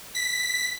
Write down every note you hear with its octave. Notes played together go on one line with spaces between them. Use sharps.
B6